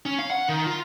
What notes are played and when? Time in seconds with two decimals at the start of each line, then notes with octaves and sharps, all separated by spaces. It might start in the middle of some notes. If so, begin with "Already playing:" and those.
0.06 C#4
0.19 F5
0.30 F#5
0.49 D#3
0.66 F4